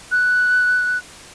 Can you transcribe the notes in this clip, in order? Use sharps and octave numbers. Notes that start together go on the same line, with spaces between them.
F#6